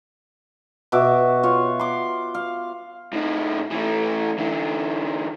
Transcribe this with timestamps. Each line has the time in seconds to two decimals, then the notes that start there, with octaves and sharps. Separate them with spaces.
0.92 B2 F#4 E5 D6
1.43 F4 C#5
1.80 C6 D6
2.35 F5
3.13 A2 D#4
3.72 E3 A3
4.39 D3 E3